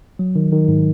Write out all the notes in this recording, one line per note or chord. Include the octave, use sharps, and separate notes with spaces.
F#3
D#3
D#3
G#2